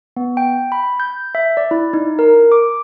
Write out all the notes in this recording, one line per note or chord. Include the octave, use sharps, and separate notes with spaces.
B3
G5
B5
G6
E5
D5
E4
D#4
A#4
D6